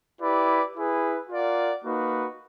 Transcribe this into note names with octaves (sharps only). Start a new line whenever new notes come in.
E4 G4 B4 D5
E4 G#4 B4
F4 A#4 D5 F#5
A#3 D#4 F#4 B4